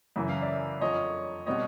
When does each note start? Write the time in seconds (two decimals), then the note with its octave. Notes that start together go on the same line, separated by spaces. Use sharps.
0.16 F#2 C#3 E3 E5
0.29 F5
0.42 D5 E5
0.81 F2 D3 F3 C#5 D#5
1.46 B2 G3 C4 C#5 D#5